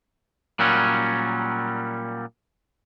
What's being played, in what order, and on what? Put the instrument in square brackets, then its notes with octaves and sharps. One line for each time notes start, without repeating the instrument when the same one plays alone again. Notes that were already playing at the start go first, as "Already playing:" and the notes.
[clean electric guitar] A#2 F#3 G3 C#4